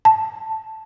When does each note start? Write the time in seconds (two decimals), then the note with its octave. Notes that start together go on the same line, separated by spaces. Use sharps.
0.05 A5